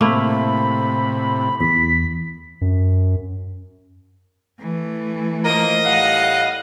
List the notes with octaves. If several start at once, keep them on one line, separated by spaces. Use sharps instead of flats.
A2 C3 A3 A#3 E4 B5
E2 B6
F#2
E3 A3
F3 A#3 A#4 D#5
A2 G3 F5 F#5